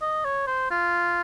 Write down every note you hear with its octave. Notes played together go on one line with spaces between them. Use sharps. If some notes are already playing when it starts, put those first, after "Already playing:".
D#5
C#5
C5
F4